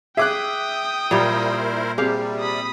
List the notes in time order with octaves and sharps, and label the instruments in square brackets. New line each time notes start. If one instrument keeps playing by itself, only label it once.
[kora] G#4 [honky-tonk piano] E5 D6 F#6 [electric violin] G5 D#6
[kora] A#2 G3 [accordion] E4 A#4 C5
[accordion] C3 G3 [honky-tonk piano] C4 G#4 [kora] G4 F5
[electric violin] B5 D#6